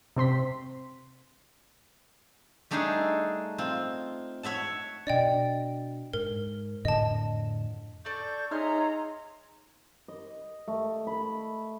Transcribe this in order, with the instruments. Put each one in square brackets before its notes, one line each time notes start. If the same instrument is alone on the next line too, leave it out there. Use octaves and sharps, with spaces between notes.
[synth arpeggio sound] C3 C4 C6 B6
[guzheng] G3 A3 D4 D#4 G#4 A4
C4 F4
C#5 E5 F#5 A5
[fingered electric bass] B2 D4 [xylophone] D5 D#5 G5
[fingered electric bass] G#2 [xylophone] A#4
[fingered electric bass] F2 A2 D3 [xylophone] D#5 A5
[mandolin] D4 A4 D5 [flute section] C#6 G6
[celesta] D#4 D#5 [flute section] G#4 C#5 C6 [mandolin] E5 F6 [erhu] A#5
[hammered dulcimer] D#5
A3
B5